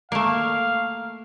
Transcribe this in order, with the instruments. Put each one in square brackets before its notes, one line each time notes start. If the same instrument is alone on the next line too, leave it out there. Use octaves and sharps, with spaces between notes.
[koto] A3 A#3 [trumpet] F5